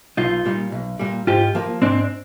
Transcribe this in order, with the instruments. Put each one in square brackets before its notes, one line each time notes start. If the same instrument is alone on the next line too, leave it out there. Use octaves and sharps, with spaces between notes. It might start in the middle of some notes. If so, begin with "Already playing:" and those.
[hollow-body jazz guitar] B1 [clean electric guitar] D#4 F4
[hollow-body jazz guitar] A#2 G3
B1
A#2 G3
[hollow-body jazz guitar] G#2 [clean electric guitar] F4 G4
[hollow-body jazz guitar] F3 A#3
[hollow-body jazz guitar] G#2 [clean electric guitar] C4 D4